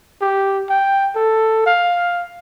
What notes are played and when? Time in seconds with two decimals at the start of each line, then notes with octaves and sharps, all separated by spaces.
0.21 G4
0.70 G5
1.15 A4
1.66 F5